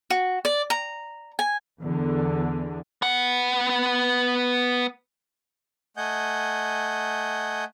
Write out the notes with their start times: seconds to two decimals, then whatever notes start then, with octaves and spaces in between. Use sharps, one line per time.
0.10 F#4
0.45 D5
0.70 A#5
1.39 G#5
1.80 E2 D3
3.02 B3 F#5
5.97 A3 D#5 F#5 G#5 G6